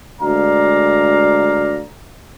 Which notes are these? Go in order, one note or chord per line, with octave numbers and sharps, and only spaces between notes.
D2 G#3 D5 F5 A#5